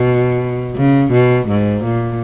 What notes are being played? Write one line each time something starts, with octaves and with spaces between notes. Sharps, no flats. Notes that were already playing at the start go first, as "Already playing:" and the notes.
Already playing: B2
C#3
B2
G#2
A#2